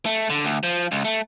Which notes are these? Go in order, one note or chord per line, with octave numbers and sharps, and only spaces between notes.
A3
D3
D2
F3
C#2
A3